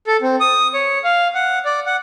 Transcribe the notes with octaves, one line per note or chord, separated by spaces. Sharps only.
A4
C4
D#6
C#5
F5
F#5
D5
F#5